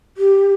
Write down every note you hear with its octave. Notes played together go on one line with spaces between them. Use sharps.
G4